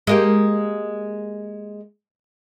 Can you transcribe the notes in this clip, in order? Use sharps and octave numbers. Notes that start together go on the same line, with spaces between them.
G#3 A#3 G4